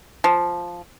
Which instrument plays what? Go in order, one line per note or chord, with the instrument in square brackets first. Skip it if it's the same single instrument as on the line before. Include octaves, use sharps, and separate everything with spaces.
[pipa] F3